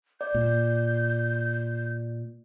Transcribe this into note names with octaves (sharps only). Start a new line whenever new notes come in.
D5 G6
A#2